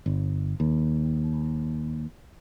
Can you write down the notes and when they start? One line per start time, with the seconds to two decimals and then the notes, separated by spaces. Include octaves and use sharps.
0.06 G1
0.60 D#2